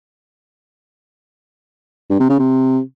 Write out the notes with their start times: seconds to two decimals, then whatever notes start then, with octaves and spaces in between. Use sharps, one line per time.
2.10 G2
2.19 C3
2.29 C#3
2.39 C3